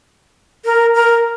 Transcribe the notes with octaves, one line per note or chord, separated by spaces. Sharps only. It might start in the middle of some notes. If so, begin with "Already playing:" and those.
A#4
A#4